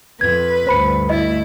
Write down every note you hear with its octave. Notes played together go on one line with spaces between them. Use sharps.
F2 B4 G#6
D2 G2 C5 B5 C#7
A3 E4 D#5